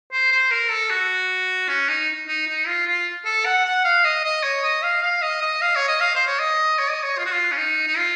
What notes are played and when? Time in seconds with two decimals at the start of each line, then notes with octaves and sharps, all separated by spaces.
0.12 C5
0.31 C5
0.51 A#4
0.71 A4
0.90 F#4
1.69 C#4
1.88 D#4
2.28 D#4
2.47 D#4
2.67 F4
2.87 F4
3.25 A4
3.45 F#5
3.65 F#5
3.84 F5
4.04 D#5
4.24 D#5
4.43 C#5
4.63 D#5
4.83 F5
5.02 F5
5.22 D#5
5.41 D#5
5.61 F5
5.76 C#5
5.88 D#5
6.00 F5
6.15 C5
6.27 C#5
6.40 D#5
6.79 C#5
6.91 D#5
7.03 C#5
7.18 F4
7.26 F#4
7.33 F4
7.52 C#4
7.57 D#4
7.87 D#4
7.97 F4